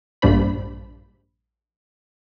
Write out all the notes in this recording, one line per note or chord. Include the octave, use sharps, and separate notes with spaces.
A#1 G2 G3 D4 C5 B5